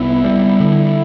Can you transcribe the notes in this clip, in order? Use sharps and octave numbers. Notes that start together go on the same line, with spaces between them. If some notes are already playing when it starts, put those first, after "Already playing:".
Already playing: C2 B3 E4
G3
D3